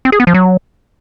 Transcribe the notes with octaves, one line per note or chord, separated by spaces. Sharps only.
C4
G#4
B3
F3
F#3